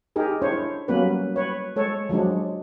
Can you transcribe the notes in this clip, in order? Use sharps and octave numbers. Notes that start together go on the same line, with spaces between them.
D#4 G4 G#4 A#4
D4 E4 C5 C#5
F#3 G3 A#3 B3 C#4 B4
B4 C#5
G#3 A4 C#5
F3 F#3 G#3 D4